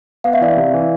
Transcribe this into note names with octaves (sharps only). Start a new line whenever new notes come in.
B3 F5
E5
E3 D5
E5
C3
E3